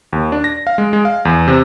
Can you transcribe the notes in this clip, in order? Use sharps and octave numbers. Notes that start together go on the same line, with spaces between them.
D#2
D4
A#6
F5
G#3
G#3
F5
E2
C3